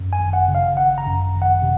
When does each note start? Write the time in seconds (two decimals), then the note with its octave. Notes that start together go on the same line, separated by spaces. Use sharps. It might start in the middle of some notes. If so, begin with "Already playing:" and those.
Already playing: F#2
0.13 G#5
0.19 G#1
0.33 F#5
0.48 C#3
0.55 F5
0.77 G#1 F#5
0.98 A#5
1.06 F#2
1.34 G#1
1.42 F#5
1.62 C3